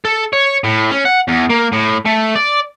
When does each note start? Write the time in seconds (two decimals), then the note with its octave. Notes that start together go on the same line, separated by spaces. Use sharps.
0.05 A4
0.33 C#5
0.64 A2
0.91 C#4
1.05 F#5
1.28 E2
1.50 A#3
1.72 A2
2.05 A3
2.35 D5